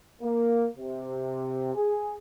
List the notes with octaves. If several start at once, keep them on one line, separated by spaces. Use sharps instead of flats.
A#3
C3
G#4